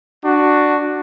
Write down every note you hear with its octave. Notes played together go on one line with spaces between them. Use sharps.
D4 F#4